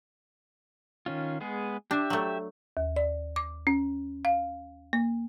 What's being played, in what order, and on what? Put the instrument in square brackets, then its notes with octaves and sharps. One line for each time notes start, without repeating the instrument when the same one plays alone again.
[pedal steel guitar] D#3 C#4 F4
G#3 B3 G#4
[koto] D4 [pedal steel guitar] G4 E5
[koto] F#3 A3
[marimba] D#2
D5
D6
C#4
F5
A#3